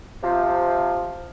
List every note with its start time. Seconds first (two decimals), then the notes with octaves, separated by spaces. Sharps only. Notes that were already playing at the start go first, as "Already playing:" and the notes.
0.23 C3 F3